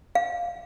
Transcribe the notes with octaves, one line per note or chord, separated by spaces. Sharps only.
F5